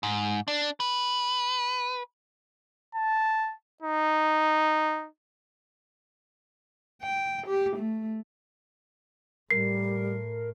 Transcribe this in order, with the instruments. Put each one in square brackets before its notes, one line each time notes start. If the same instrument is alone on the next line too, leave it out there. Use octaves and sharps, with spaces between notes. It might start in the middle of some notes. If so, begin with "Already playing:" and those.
[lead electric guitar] G#2
D4
B4
[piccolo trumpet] A5
D#4
[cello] G5
G4
A3
[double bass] A2 [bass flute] G3 [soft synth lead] A#4 [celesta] C7